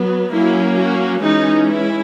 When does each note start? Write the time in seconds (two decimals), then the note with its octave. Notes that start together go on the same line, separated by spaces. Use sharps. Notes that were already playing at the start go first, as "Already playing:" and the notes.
Already playing: F#3 B3
0.32 F#3 A#3 C#4 E4
0.77 F#4
1.22 E3 G#3 C#4 D#4
1.67 E4